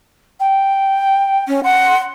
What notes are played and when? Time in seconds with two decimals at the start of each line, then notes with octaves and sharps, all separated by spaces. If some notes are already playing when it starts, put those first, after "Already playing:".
0.39 G5
1.48 C#4
1.64 F#5 C6